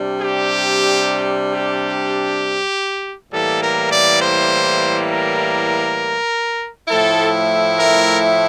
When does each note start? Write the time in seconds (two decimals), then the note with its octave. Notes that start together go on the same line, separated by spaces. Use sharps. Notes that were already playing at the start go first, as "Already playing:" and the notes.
Already playing: C3 G3 D4
0.20 G4
1.54 G4
3.31 A2 E3 G3 A#3 A4
3.61 A#4
3.91 D5
4.21 C5
5.10 A#4
6.88 A2 F3 A3 E4 A4
7.78 A#4